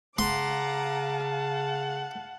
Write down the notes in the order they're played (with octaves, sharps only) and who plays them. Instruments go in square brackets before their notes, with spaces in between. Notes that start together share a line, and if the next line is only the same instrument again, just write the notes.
[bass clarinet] C#3 [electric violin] F5 A5 [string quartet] F#5 A#5 D6 [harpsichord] C6
[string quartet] F#5